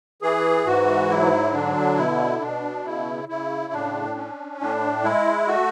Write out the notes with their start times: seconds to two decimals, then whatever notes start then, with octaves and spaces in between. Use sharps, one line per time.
0.22 E3 G#4
0.65 G#2 F#4
1.10 F#3 E4
1.53 D3 D4
1.97 B2 E4
2.41 B2 D4
2.85 C#3 E4
3.29 C#3 E4
3.73 A2 D4
4.16 C#4
4.60 A2 D4
5.03 G#3 E4
5.47 A3 F#4